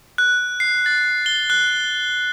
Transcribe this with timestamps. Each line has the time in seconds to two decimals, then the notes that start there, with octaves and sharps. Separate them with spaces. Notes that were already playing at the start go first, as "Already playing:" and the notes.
0.18 F#6
0.60 C7
0.86 A6
1.26 G7
1.50 F#6